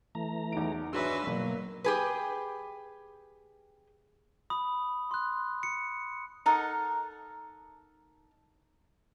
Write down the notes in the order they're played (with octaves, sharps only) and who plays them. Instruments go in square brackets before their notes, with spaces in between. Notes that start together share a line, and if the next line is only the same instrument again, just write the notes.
[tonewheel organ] E3 A3 A#5
[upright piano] E2 F#3 D7 [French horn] D#4
[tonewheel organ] D4 C6 E6 [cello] F#4 B4 [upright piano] G#4 C#5 E5
[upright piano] G1 [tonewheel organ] B2 [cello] F#3 [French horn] A#3
[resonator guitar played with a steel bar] G4 G#4 B4
[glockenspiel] B5 D#6
C6 F#6
C#7
[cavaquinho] D#4 A4 A#4 F#5